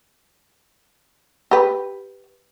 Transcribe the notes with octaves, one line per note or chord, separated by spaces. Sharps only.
G4 B4